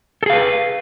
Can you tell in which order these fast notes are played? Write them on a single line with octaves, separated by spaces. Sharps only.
A4 G#4 F5 B4